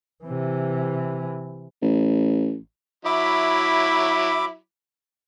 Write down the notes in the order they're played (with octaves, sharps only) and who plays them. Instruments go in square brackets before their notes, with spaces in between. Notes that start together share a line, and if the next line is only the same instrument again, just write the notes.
[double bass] C3 E3
[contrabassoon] A1
[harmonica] F#3 E4 [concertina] E5 B5 D6